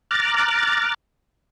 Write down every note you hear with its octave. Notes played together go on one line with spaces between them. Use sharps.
A#5 D6 F6 F#6 A6